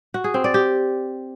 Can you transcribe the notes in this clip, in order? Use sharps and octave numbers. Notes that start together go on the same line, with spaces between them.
F#4
G#4
C4
D5
G4